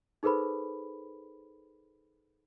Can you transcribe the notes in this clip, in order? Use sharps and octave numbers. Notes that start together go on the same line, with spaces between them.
D#4 G#4 A4 B4 C5 B5